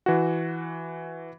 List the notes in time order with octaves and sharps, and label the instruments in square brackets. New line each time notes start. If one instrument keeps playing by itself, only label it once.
[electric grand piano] E3 F#4